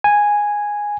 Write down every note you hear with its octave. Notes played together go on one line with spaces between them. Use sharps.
G#5